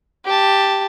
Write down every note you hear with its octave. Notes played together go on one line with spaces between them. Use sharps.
G4 A5